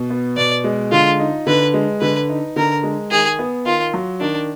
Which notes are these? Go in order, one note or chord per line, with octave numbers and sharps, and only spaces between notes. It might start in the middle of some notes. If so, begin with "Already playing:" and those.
Already playing: B2
B3
B2 D5
G#3
D3 F4
D#4
D3 B4
G#3
D3 B4
D#4
D3 A#4
G#3
D#3 G#4
B3
D#3 F4
F#3
D#3 D4